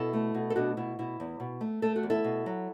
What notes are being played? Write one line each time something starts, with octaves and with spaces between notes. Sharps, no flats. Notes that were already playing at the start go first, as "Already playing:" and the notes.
Already playing: B2 E4 A4
A3
B2
A4
B2 D4 F#4
B2 E4
B2 E4
E2
B2
A3
A3 A4
F#4
E2
E4 A4
B2
F#3